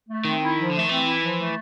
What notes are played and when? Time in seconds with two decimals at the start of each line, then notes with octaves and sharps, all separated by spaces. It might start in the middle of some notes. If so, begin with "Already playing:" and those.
0.09 A3
0.25 D#3 C4
0.41 E4
0.57 F3
0.70 D3 A3
0.79 D#3
0.89 E3 C4
1.05 E4
1.21 F3
1.38 A3